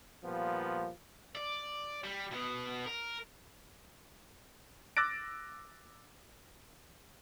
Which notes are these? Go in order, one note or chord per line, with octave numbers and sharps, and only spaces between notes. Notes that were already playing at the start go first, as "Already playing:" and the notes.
A#2 F3 G3 B3 F4
D5
G3
B2 B3
A#4
D6 E6 F#6 A6 A#6 D7